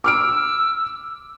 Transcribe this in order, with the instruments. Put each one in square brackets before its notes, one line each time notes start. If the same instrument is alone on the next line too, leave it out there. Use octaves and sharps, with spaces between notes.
[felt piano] D6 F6 D7 [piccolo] E6